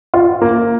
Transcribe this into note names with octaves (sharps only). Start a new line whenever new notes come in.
F4
A#3